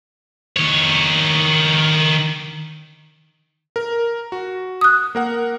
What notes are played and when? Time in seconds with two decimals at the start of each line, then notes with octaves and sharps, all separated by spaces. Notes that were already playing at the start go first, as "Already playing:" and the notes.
0.57 D#3 C#5
3.76 A#4
4.32 F#4
4.81 D#6 F#6
5.15 A#3 A#4 F#5